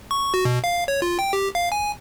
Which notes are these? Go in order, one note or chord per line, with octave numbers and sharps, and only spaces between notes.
C#6
F#4
B2
F5
C#5
F4
G5
G4
F5
G#5